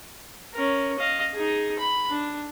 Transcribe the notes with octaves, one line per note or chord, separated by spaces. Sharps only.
C#4 A#4
D#5 F5
D#4 G#4
B5
D4